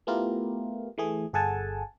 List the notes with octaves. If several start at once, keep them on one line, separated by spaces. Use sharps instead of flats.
A3 B3 E4 F4 G4 A#4
E3 A3 G#4
G1 G#4 A4 F#5 G#5 A5